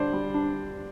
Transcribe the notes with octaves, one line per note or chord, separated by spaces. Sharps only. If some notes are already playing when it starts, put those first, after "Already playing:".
Already playing: D3 G3 D4 C5 D5
G3
D4